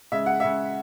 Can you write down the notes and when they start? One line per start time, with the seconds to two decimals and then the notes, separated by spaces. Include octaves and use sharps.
0.12 C#3 G#3 E5
0.26 F#5
0.40 C#3 G#3 E5